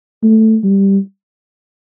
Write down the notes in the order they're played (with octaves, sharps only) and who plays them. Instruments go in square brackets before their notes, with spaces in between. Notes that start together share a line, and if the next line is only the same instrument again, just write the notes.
[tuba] A3
G3